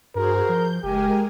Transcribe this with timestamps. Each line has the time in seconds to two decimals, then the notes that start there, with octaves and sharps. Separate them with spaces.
0.15 G2 F#4 G#4 A#4 C5
0.49 F3 G6
0.83 F#1 G#3 G4 A#4 G#5